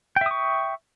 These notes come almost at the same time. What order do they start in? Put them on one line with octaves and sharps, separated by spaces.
G5 E5 D#6 C#6